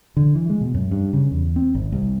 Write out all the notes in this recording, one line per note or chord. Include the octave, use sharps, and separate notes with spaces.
D3
E3
G#3
B2
F#2
G2
C#3
E2
C4
G#1
C2